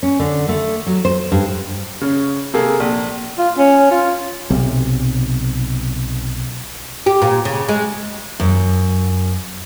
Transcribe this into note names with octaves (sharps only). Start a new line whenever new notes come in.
C#4
D3
A3
F#3
C5
G2
C#3 C#4
C3 A#3 G#4 A4
A#1
F4
C#4
F4
B1 C3
G4
A#2
C#3
G#3
F#2